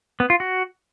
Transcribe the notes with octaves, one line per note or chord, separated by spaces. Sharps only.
B3
F4
F#4